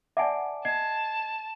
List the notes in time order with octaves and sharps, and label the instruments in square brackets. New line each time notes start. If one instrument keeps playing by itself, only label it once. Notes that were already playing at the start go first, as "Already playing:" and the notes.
[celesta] D5 A5 D6 [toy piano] E5 F#5 G#5
[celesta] D#5 G#6 C7 [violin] A5